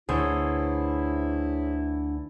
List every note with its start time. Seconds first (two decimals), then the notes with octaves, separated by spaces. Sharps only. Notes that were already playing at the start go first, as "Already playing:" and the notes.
0.09 D2 D3 E3 E4 G#4 C5 C#5